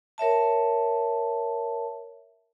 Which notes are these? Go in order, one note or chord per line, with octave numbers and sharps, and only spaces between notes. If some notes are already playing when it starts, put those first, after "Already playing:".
A#4 C#5 E5 A5